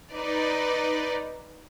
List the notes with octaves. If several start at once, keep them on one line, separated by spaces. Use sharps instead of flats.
D#4 B4 D5